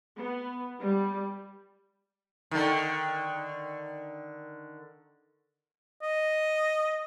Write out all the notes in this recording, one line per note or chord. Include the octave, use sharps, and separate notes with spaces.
B3
G3
D3 D#3
D#5